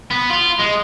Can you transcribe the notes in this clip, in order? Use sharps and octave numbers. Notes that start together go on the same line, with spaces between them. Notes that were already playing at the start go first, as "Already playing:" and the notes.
B3
F4
G#3